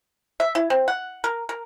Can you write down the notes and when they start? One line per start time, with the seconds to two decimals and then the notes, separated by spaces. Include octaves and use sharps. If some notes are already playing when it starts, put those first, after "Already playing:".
0.40 E5
0.55 E4
0.70 C4
0.88 F#5
1.24 A#4
1.49 A#4